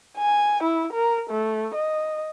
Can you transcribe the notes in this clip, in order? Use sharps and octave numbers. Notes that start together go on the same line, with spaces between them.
G#5
E4
A#4
A3
D#5